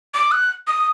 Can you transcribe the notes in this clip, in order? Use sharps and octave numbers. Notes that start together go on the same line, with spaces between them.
D6
F#6
D#6